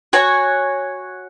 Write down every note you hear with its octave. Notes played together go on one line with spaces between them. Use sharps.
F#4 C#5 G#5